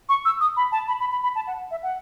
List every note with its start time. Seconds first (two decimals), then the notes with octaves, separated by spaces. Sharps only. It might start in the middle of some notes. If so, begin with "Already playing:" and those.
0.09 C#6
0.25 E6
0.41 D#6
0.57 B5
0.72 A5
0.88 B5
1.00 B5
1.12 B5
1.23 B5
1.35 A5
1.47 F#5
1.71 E5
1.83 F#5